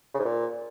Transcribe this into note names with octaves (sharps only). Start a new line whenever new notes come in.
C#3
G#2
A#2